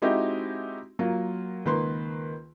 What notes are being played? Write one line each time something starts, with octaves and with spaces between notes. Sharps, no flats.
G#3 C4 D#4 E4 F#4 G4
F#3 A#3 F4
C#2 D#3 A#3 B4 C6